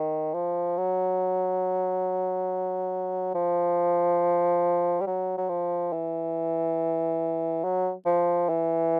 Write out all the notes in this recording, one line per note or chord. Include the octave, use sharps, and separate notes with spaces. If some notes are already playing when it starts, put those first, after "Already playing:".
Already playing: D#3
F3
F#3
F3
G3
F#3
F#3
F3
E3
F#3
F3
E3